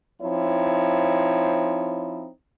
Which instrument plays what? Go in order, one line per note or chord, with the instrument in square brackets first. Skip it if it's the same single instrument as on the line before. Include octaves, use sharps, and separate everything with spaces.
[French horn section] F3 C4 D#4 E4 C#5